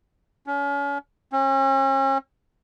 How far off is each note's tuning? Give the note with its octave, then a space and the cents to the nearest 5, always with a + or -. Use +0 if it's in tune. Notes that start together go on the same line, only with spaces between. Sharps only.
C#4 +35
C#4 -40